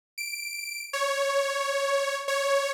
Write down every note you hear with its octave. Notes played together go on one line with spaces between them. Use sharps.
D7
C#5
C#5